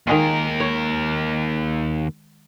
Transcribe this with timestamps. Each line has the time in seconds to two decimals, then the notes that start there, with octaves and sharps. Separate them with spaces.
0.07 D#2 D#3 G#3 F4 A#4
0.60 C#5